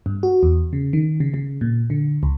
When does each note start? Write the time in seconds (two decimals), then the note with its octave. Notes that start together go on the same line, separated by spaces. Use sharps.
0.06 G2
0.23 F#4
0.43 E2
0.73 C#3
0.93 D#3
1.20 C#3
1.34 C#3
1.61 A#2
1.90 D3
2.23 C#2